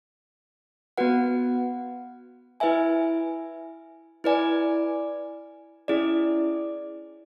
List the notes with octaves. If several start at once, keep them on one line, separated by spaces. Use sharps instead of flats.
B3 F#4 B4 F#5
E4 B4 E5 G#5
E4 B4 D5 G#5
C#4 E4 G#4 D5